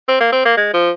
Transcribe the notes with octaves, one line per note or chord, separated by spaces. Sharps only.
C4
A#3
C4
A#3
G#3
F3